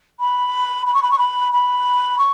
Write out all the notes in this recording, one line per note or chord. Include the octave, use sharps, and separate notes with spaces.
B5
B5
C#6
B5
C#6
B5
B5
C#6